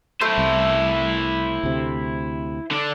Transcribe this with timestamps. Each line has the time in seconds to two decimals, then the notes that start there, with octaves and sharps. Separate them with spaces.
0.21 A3 E4 C5
0.38 C2
1.63 D2 C3
2.71 D3 D4